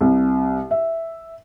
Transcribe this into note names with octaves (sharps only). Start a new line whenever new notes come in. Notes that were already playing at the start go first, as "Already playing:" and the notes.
C2
E5